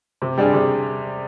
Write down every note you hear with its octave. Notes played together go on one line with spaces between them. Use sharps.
C3
G3 D4 G#4
C3